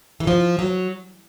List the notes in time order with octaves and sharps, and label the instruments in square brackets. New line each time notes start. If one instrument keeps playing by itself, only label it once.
[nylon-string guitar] E3
F3
F#3